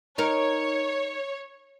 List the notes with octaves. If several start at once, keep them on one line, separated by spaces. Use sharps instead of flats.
D#4 A#4 C#5